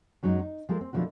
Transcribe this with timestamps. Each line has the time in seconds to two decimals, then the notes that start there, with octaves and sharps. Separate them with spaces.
0.23 F#2 F#3 G#3 D#4
0.40 D#4
0.69 F3 G#3 A4 A#4
0.81 C4
0.93 B2 D3 F3 F#3 E4 F#4